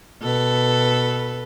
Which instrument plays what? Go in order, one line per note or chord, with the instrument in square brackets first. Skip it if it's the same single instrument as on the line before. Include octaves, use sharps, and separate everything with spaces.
[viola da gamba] B2 A4 B4